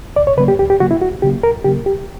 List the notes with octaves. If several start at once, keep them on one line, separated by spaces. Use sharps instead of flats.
D2 D5
C#5
C#3 F#3 A#3 B4
G4
D2 G4
G4
C#3 F#3 A#3 F#4
E4
D2 F#4
C#3 F#3 A#3 G4
D2 A#4
C#3 F#3 A#3 G4
C#2 G4